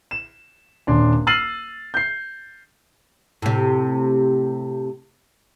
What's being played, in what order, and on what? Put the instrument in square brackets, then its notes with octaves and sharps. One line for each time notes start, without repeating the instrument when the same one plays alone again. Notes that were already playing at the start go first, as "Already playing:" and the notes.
[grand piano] E7
D#1 D4 C6
E6 F6 A6 C7 D#7 F#7
G6 C7
[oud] A2 C3